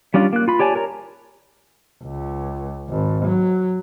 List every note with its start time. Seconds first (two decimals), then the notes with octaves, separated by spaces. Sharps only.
0.14 G3 C#4 D4 F4
0.33 A#3 F#6
0.48 F4 B5
0.59 G4 C#5 D5 G#5 A5
0.75 A#4 C#5 A#5
2.04 C#2
2.90 G#1
3.25 F#3